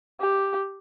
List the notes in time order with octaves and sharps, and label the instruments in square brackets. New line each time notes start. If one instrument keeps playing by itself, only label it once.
[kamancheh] G4